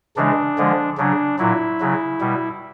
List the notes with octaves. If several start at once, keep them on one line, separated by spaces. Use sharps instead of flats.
C#3 E3 G#3 D4
D3 F3 G#3
C#3 F#3 D4
A#2 F#3 E4
C#3 F#3
B2 G3